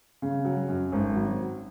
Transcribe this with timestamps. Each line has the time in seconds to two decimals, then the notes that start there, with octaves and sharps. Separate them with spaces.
0.22 C#3
0.45 F#3
0.68 F#2
0.92 G#1
1.16 F#3